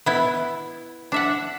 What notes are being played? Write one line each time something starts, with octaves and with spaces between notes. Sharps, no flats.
B3 E4
D4 E5 F#5